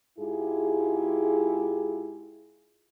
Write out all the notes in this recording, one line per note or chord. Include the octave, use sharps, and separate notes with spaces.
G#2 E4 F4 G4 G#4